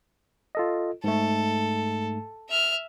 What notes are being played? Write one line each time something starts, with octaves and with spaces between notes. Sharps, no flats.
F4 A4 D#5
G#2 A3 A4
E5 F6